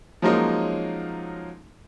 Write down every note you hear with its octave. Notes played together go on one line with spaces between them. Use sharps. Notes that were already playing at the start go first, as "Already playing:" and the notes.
F3 F#3 G#3 A#3 C#4 D#4